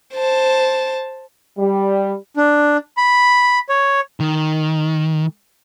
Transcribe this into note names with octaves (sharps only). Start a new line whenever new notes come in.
C5 A5
G3
D4
B5
C#5
D#3